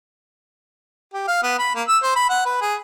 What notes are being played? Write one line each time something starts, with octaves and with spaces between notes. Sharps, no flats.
G4
F5
B3
B5
A#3
E6
C5
B5
F#5
B4
G#4